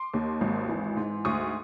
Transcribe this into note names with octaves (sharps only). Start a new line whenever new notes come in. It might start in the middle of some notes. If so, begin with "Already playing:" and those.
Already playing: C6 D6
D#2
G#1
E3
G#2
D2 C#6 D#6